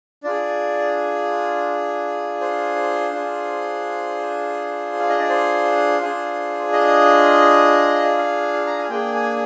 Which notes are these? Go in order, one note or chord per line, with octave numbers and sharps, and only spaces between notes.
D4 F4 G#4 D5
C5
D4 F4 G#4
F5
D#5
D5
C5
D4 F4 G#4
D#5
F5
A#5
G#5
A#3 D4 G#4 G5
G#5